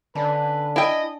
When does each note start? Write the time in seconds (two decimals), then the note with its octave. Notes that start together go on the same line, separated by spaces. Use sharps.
0.15 D3 C#4 D4 B4
0.76 E4 D5 D#5 G5